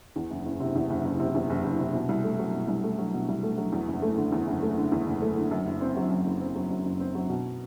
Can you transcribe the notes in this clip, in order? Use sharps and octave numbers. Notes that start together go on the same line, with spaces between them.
E2
F#1
F#1
C3
E2
F#1
F#1
C3
E2
F#1
F#1
C3
B2
C2
A3
F#3
B2
C2
A3
F#3
B2
C2
A3
F#3
E2
F#1
A3
D3
E2
F#1
A3
D3
E2
F#1
A3
D3
F#2
F#1
C4
F#3
F#2
F#1
C4
F#3
F#2
F#1
C4
F#3
B2